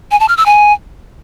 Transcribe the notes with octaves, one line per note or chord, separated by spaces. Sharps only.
G#5
A5
F6
E6
G#5